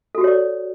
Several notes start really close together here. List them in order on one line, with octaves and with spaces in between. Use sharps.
A4 F#4 G4 C#5 D5